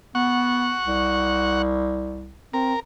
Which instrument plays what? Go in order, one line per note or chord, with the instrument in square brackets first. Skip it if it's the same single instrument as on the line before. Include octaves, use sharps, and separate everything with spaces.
[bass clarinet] B3 [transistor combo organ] F#5 C#6
[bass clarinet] C2
[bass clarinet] C4 [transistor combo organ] A#4